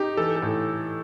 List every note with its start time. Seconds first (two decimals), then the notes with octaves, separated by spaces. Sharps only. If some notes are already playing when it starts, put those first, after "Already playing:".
Already playing: D#4 G4
0.17 E3 A4
0.36 A4
0.42 A2